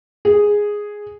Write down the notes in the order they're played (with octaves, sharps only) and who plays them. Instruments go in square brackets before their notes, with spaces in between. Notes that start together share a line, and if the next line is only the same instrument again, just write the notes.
[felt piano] G#4